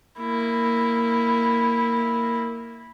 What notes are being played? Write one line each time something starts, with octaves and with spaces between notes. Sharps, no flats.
A#3 E4